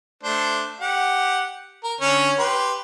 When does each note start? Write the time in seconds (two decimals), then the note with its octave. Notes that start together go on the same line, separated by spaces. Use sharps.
0.23 A3 D4 C5
0.80 G4 F#5
1.84 A#4
2.01 D3 C#4 C#5
2.39 G4 B4 C6